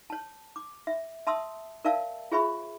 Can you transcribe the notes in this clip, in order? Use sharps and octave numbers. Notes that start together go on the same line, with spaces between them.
C#5 A5
D6
E5
E5 A5 C6 D#6 E6
A#4 D5 E5 F5 A5 E6
F4 G#4 C5 E5 B5 C#6